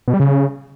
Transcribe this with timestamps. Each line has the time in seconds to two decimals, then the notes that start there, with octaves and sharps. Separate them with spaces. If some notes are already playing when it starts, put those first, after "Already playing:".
0.08 B2
0.14 G3
0.20 C#3